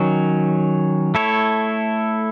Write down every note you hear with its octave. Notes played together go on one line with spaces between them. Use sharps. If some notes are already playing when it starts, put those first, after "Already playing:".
Already playing: D#3 F#3 C#4
A3 E4 A4 C#5